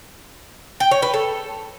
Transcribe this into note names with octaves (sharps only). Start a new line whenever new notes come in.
G5
C#5
B4
A4